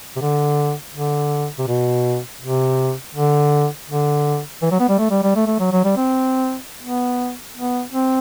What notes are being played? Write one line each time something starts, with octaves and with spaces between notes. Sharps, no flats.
C3
D3
D3
C3
B2
C3
D3
D3
E3
F#3
B3
G3
A3
G3
G3
A3
A3
F#3
F#3
G3
C4
B3
B3
C4